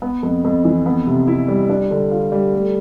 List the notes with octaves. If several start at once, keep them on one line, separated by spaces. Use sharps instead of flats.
B3
F2
F2
E3
B3
C3
E4
G3
D4
D3
F4
G3
A3